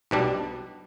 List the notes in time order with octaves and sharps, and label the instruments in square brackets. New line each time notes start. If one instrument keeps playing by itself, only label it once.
[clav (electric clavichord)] B1 B2 G3 D4